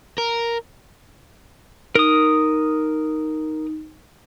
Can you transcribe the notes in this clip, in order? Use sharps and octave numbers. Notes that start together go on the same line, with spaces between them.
A#4
D#4 A#4 D#6